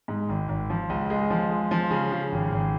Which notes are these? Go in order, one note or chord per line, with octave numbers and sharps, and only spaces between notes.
G#2
G#1
G#1
F3
C#2
G#3
F3
G#3
F3
C#3
C#3
G#1
G#1